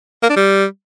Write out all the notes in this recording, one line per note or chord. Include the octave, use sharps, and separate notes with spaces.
A#3
D4
G3